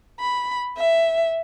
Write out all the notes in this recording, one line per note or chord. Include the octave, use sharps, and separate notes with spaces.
B5
E5